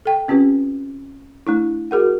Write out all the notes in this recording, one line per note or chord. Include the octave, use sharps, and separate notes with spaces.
A4 G5
C4 C#4 F4 G4 B4
A3 D4 E4
F#4 G#4 A#4 F#5